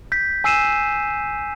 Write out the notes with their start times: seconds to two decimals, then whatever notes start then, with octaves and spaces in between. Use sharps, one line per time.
0.12 G6 B6
0.44 G#5 E6 C7 D#7 E7